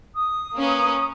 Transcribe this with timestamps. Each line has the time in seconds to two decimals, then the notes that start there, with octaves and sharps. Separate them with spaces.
0.15 D#6
0.54 A#3 C#4 B4